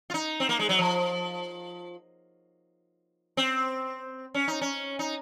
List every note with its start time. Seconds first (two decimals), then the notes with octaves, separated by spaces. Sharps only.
0.10 F4
0.14 D#4
0.40 C4
0.49 A#3
0.59 G#3
0.69 F#3
0.79 F3
3.37 C4
4.34 C#4
4.48 D#4
4.61 C#4
4.99 D#4